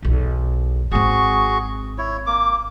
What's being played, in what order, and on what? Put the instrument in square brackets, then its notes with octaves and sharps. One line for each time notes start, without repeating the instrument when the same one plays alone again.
[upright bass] B1 E2
[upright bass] G#1 C4 [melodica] F#4 G#4 C#6
[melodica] E4 C#5
A#3 D6